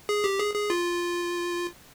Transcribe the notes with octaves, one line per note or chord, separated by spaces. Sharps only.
G#4
G4
G#4
G#4
F4